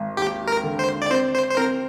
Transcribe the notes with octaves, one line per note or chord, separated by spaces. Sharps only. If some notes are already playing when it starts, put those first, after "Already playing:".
Already playing: G#1
D#2 G4
A#4
D3
C5
D5
C4 C5
C5
C5
C4 A#4